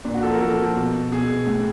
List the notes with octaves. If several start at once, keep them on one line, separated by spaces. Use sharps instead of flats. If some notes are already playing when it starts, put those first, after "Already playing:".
A#2 D4
F#4
F3 A4
A#4
A#2 A4
F3
B2
B2 G#4
A2